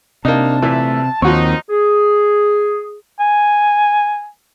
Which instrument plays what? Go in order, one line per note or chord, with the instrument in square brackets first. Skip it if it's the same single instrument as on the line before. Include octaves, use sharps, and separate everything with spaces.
[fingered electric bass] C3 [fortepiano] A#3 D#4 [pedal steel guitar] D4 [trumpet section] A5
[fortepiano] A#2 E3 [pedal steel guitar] A3 E5
[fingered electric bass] D#2 [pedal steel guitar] D#3 C4 [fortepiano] F3 F#4 C#5 [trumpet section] D#4
[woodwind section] G#4
[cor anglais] G#5